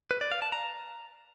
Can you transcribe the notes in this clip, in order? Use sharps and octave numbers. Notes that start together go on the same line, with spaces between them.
B4
D5
F5
A5
A#5